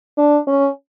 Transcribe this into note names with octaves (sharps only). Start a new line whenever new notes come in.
D4
C#4